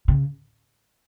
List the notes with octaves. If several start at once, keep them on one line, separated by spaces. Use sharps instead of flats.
C#3